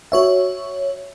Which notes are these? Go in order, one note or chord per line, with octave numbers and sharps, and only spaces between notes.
F#4 C#5 E5